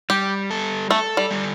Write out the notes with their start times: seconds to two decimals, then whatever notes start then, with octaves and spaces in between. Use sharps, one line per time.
0.10 G3 G4
0.51 A4
0.90 A3 A4
1.17 G3
1.30 G3